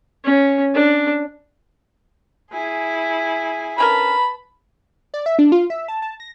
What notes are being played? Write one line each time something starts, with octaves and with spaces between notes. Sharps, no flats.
C#4
D4
E4 G#4 G#5
D3 C#4 A#4 B4 A5 B5
D5
E5
D4
F4
E5
A5
A5
A#6